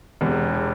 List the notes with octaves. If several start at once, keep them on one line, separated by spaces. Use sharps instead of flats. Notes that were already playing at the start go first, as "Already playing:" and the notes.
E1 E2 C3